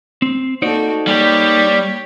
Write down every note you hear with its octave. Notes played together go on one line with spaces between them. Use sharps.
C4
A#3 D#4 F#4 A4 C5 D5
G3 A#3 G4 C#5